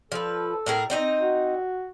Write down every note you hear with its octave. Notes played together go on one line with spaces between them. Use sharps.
F3 A4 B4
A2 G#4 A#4
C4 D#4 D#5
F#4